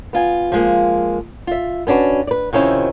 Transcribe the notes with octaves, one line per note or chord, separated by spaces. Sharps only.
B3 F4 G#5
F3 G#3 A#3
F4 E5
B3 C#4 D4 F#4 B4
B4 D5
C3 D#3 F3 C#4 D#4 E4